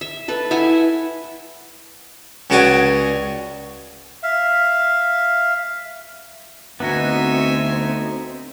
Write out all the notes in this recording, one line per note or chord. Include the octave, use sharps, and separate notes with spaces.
E5
A4 B4
E4 E5 F#5 G#5
C#2 C#3 F#4 D5 F#5 G#5
E5 F5
D2 B3 C4 D#4 F#4 E5 G#5